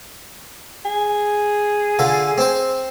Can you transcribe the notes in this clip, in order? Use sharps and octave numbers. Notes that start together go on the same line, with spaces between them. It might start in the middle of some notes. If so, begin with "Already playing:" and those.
G#4
D3 F4 A4
C4 C5